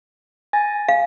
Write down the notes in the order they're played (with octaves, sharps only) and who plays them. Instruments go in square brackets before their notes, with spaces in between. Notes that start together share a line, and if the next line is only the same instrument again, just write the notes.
[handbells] G#5 A6 A#6
[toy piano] F5